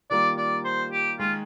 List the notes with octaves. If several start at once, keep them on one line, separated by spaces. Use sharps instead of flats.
D#3 G3 A#3 F4 D5
D5
C5
G4
D#3 G#3 F4